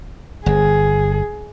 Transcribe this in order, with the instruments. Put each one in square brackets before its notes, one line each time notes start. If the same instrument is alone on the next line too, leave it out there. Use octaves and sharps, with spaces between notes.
[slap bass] G1 [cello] G#4